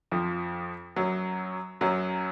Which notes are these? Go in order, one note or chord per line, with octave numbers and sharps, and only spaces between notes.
F2 F3
F#2 F#3
F#2 F#3